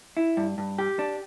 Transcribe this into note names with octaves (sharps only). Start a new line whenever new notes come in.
E4
G2
G2
G4
D4